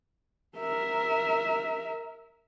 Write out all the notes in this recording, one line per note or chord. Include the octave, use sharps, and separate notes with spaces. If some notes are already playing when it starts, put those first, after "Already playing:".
A#4 E5